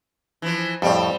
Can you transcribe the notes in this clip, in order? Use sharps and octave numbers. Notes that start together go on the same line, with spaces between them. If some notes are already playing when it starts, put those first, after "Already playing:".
E3 F3
F2 A2 G3 C4